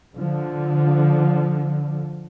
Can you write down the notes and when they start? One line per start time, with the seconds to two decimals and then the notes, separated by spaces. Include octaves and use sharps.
0.17 D3 F3